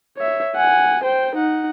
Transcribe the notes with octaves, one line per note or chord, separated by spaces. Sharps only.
C#5 E5
F#5 G#5
C5 G5
D#4 F#5